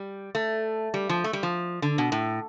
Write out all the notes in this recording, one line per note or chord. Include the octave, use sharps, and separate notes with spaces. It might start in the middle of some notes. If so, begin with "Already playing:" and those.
Already playing: G3
A3
G3
F3
A3
G3
F3
D3
B2
A2